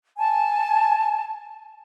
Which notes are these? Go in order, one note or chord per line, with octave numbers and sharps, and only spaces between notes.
G#5 A5